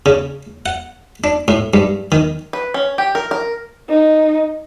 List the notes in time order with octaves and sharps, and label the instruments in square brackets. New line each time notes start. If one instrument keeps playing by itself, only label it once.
[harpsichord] C#3
F#5
D4
A2
G2
D#3
[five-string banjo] B4
C#4
G4
A#4
A#4
[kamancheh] D#4